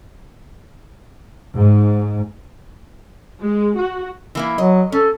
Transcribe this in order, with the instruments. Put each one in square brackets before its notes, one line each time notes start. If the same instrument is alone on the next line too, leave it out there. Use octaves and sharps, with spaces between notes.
[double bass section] G#2
[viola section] G#3
F#4
[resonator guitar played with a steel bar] E3 A#3 E4
[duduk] F#3 [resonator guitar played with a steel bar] D#5
[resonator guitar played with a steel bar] C#4 [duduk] A4